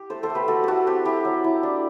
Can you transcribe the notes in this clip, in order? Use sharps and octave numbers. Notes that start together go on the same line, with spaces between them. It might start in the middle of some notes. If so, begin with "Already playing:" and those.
Already playing: G4
A3 A4 C5
A4 C5
A3
G4 B4
A3 F#4 A4
A3 F#4 G4 A4
C4 G4
E4 G4
F#3
E4
D4